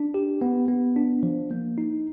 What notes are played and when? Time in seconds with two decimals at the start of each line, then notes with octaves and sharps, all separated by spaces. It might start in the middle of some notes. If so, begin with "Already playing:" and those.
Already playing: D4
0.14 G4
0.41 B3
0.68 B3
0.96 D4
1.23 F3
1.51 A#3
1.78 D#4